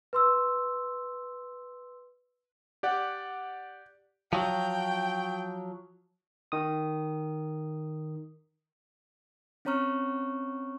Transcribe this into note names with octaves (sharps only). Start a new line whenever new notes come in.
B4 C6 E6
G4 D5 F#5
F3 F#3 G5
D#3 D#6
C4 C#4 C#5 A#5 C#6 F6